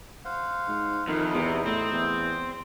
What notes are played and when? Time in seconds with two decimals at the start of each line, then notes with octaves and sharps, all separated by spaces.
0.25 C5 F5 F#5
0.68 G#2
1.08 F2 D#3 D#4 E4 D#5
1.34 E2 C3
1.66 A2 C4
1.92 E2